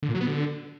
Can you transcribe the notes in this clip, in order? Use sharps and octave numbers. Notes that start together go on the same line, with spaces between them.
D3
A#2
F#3
B3
D3